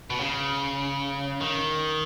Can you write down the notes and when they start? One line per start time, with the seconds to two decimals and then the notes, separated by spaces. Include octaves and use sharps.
0.10 B2
0.20 C#3
1.41 D#3